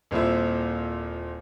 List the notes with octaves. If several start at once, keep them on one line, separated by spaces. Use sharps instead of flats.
D#1 A#2 C4 E4 E5